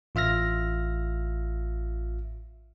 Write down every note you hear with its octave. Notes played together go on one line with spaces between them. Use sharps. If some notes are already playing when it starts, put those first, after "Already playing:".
A1 F4 E5 F6 A#6